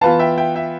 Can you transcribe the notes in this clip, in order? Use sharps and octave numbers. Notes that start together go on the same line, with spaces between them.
E3 B3 F4 F5 A5
E5 G5
E5 G5
E5 G5